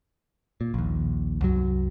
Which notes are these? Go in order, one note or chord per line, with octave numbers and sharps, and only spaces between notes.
A#2
A#1 D#2
C2 F#2 F#3